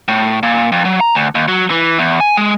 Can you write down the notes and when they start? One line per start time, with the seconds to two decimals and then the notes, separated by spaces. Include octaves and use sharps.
0.08 A2
0.43 A#2
0.72 F2
0.85 F#3
1.00 A#5
1.15 D2
1.35 D#2
1.48 F#3
1.70 E3
1.99 E2
2.20 G#5
2.37 G#3